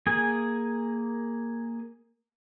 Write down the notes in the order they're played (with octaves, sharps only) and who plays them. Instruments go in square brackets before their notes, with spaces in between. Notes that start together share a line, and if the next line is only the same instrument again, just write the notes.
[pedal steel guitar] A#3 G#4 G#5